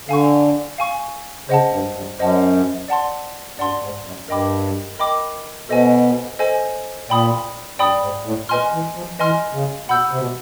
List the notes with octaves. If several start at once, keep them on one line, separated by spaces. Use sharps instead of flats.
D3 F5 G#5 C#6
F5 G#5 C#6
C#3 C5 D#5 F#5 A5
G2
G2
F#2 C5 D#5 F#5 A5
D5 F#5 A5 C6
G2 D5 F#5 A5 C6
G#2
F#2
G2 A#4 D#5 G5 B5 D6
A#4 D#5 G5 B5 D6
B2 A4 C5 D#5 G#5
A4 C5 D#5 G#5
A#2 D5 G5 B5 D#6
G2 D5 G5 B5 D#6
G#2
A2
A#2 B4 D#5 G#5 C6 F6
E3
F3
E3 B4 D#5 G#5 C6 F6
C#3
B2 F#5 B5 E6 G6
C3
B2